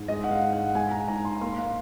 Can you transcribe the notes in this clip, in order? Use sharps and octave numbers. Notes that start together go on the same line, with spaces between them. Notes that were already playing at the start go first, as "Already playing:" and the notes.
Already playing: G#2
G#3 D#5
F#5
F5
G#2
F#5
G#3 G#5
A#5
G#2 A#5
C6
A#3 C6
F5